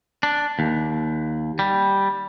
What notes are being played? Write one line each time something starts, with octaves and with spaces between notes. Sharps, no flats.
D4
D#2
G3